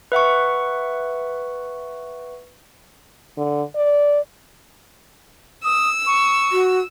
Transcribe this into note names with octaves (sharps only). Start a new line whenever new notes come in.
B4 E5 F#5 C#6
D3
D5
D#6 E6
C#6
F#4